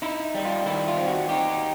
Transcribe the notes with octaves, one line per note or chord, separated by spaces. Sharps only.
D#4 E4
G3
F4
D#3 E4
F4
C4
F#4
D#4 G4